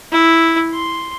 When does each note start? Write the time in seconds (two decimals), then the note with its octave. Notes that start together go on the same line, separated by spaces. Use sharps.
0.12 E4
0.73 C6